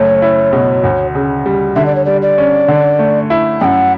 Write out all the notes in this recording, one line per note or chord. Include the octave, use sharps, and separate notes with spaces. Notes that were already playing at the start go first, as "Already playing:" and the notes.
Already playing: F#1 A3 C#5
E4
B2
D2
C#3
G3
D3 E5
D5
C#5
G3 D5
D5
C#4
D3
A3
E4
F#2 F#5 G5